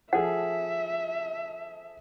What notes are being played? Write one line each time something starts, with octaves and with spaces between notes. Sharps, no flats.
F3 G#4 A4 E5 F#5